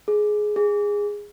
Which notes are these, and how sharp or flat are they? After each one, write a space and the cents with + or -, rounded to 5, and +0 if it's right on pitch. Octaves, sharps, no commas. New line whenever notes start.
G#4 +15
G#4 -15